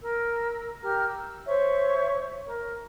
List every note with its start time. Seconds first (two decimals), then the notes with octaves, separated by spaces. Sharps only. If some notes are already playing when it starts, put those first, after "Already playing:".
0.02 A#4 E6
0.81 G4 A#4 A#5 F6
1.08 E6
1.46 C5 C#5 E5 C#6
2.46 A#4